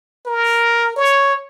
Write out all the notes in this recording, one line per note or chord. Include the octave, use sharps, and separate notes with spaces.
A#4
C#5